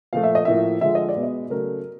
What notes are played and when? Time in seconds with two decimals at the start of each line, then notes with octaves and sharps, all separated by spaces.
0.13 A#2 F3 A3 F5
0.23 E5
0.35 D#5
0.45 A2 F3 A#3 E5
0.81 D3 F3 G#3 E5
0.95 D#5
1.09 D5
1.16 B2 G#3 B3
1.23 D#5
1.50 C#3 F#3 A3 A#4